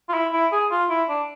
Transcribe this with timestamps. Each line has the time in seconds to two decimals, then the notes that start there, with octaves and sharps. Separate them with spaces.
0.09 F4
0.14 E4
0.33 E4
0.52 G#4
0.71 F4
0.90 E4
1.09 D4